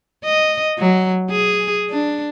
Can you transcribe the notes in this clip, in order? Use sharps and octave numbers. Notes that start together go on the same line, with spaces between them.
D#5
F#3
G#4
D4